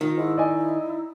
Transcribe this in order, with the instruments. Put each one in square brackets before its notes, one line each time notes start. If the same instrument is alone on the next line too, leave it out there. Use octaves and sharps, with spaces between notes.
[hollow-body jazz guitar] D#3 [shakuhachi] F4
[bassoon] G#2 [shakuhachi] E4
[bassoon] D#4 [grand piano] D5 D#5 G#5